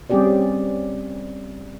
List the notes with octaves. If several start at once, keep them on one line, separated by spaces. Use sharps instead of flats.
G3 C4 C#4 G4 G#4 D5